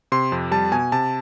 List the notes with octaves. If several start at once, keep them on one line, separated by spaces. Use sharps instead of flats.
C3 C6
F2
G3 A5
B2 G#5
C3 A5